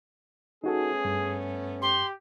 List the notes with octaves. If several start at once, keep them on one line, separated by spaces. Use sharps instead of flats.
A3 B3 C#4 D#4 F#4 G#4 A4
G2
G4 C6